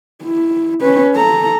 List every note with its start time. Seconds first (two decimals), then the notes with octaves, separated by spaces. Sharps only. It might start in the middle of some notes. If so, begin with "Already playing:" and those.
0.23 E4
0.81 C#4 B4
1.15 A4 A#5